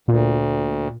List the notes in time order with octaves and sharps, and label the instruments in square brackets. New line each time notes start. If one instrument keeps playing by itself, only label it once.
[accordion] D2 [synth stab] A#2